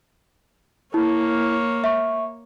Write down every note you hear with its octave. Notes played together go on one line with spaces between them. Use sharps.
A#3 E4 C#5
E5 C#6